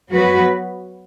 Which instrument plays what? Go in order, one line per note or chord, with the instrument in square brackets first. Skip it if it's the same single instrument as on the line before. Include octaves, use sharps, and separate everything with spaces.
[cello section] F#3 B3 F#4 B4